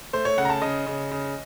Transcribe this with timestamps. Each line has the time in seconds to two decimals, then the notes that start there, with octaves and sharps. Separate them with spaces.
0.13 A3 C5
0.25 C#5
0.38 C#3 F#5
0.45 A#5
0.50 A5
0.62 C#3 D#5
0.87 C#3
1.11 C#3